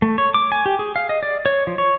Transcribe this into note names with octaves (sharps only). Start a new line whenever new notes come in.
A3
C#5
D6
G#5
G4
G#4
F5
D#5
D5
C#5
F3
C#5